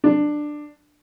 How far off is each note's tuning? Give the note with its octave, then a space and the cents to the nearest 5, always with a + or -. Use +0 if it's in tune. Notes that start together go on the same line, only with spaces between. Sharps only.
D4 +15